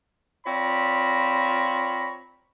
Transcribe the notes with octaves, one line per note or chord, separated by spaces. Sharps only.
C4 F4 C#5 D5 A#5 B5